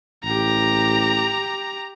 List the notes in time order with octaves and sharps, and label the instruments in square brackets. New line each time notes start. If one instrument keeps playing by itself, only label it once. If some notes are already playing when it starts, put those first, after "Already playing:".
[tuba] A1 [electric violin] G4 A#5